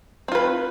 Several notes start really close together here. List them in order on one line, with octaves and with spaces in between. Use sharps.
C4 F4 B4